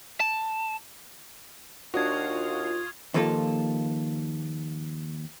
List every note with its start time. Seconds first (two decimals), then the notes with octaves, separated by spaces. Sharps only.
0.20 A5
1.94 D#2 D4 F4 F#4 C#6 D#6 G#6
3.14 D#2 F3 A#3 F4 A4